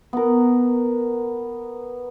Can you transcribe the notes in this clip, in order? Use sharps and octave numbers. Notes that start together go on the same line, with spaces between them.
B3 A#4